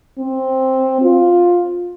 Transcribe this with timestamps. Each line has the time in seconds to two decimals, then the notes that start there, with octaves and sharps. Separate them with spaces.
0.18 C4
1.02 F4